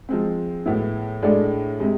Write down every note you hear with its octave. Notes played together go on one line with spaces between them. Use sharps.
F3 G#3 C4
A2 G#3 B3 E4
A2 G#3 D4 A4 D5
C3 G#3